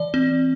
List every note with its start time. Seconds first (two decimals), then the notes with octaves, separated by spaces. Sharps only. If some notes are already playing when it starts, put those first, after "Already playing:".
Already playing: E3 D5
0.14 C4